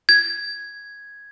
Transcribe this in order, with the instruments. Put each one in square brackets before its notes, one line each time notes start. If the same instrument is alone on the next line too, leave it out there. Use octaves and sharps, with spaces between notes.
[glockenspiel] G#6